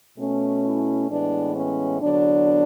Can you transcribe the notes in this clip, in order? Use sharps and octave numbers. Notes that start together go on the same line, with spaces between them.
B2 A3 C#4
E4
A2 E3 G#3 B3 D4
C#4
E2 D3 F#3 B3 D4